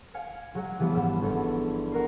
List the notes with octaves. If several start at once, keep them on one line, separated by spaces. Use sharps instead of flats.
F5 G#5 F6 G#6 C#7 D7
F#3 G#3 F#4
E3 F3 G3 B3
G#1 G#2 E6
G1 A4 E7
F#4 A#4 C7